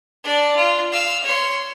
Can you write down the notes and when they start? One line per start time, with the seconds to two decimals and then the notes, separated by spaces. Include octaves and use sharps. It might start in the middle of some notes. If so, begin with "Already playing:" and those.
0.24 D4 D5
0.56 F4
0.92 F5 E6
1.23 C#5 C6